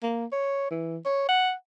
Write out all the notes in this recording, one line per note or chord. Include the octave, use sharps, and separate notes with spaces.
A#3
C#5
E3
C#5
F#5